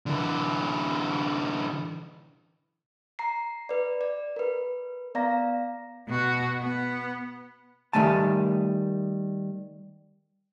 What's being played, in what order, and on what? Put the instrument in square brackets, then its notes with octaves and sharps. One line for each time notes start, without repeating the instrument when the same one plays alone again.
[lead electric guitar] D3 E3
[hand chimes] A#5 C7
B4 D5
D5
A#4 B4
B3 D5 F5 A#5 A#6
[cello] B2 F#4
B3
[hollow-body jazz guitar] D#3 G3 A3 G#5 A5